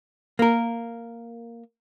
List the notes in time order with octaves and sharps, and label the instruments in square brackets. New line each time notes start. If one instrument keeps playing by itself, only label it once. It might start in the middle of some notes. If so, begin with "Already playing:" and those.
[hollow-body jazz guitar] A#3 A#4